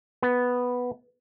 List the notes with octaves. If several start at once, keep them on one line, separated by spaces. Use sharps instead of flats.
B3